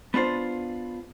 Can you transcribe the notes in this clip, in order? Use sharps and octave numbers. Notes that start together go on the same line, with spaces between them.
B3 D4 F4 C5